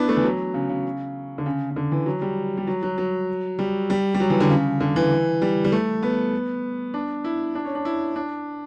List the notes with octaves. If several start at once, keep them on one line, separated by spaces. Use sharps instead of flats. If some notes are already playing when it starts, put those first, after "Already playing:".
Already playing: B3 D4 E4
A3
E3
F#3
C#3
C#3
D3
C#3
C#3
D3
E3
F#3
G3
G3
F#3
F#3
F#3
G3
G3
G3
F#3
E3
D3
C#3
D3
E3
G3
G3
A3
B3
D4
E4
D4
C#4
D4
E4
D4